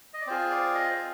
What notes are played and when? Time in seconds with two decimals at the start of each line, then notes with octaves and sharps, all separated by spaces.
0.14 D#5
0.21 D5
0.27 C4 F4 G#4 C5
0.51 D5
0.75 D#5
0.90 C5